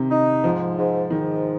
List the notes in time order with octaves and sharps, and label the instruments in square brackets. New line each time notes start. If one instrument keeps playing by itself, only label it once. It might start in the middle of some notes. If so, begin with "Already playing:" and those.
Already playing: [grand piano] C3 D#3
[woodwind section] D#4
[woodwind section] G#2 [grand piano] F3
[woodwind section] G#2
[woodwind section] G#2 [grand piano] D#3